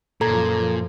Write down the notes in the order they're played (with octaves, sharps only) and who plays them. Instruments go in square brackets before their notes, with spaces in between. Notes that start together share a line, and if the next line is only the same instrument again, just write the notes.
[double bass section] F#2 F3 [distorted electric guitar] A#2 [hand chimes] A4 A#5 G#6